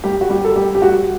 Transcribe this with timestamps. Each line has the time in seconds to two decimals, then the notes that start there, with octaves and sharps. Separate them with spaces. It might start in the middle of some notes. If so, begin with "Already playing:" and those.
0.04 G3 G4
0.21 F#4
0.30 G3 G4
0.45 A4
0.56 G3 G4
0.75 G4
0.82 G3 F#4